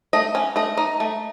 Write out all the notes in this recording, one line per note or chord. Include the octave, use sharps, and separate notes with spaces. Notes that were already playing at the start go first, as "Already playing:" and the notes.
A3 D#5
C#4
A3 D#5
D#4 D#5
A3